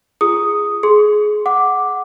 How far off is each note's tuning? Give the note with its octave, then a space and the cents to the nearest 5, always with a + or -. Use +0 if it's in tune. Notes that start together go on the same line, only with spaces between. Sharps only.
F4 -25 G#4 +0 D#6 +0
G#4 +20 C6 +0
F#5 +0 D6 +0